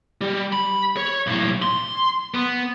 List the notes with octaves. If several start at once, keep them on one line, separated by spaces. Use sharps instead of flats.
G3
B5
C#5
B1 A2
C6
B3